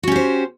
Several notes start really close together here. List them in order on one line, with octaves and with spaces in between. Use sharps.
F#4 C#4 G4 C5